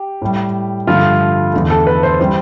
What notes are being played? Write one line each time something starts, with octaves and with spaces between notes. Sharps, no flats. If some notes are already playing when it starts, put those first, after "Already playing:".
Already playing: G4
A2 G3
G2 D3 F3 A3 F4
E2 D3 A3
A4
B4
C5
E3 G3 C5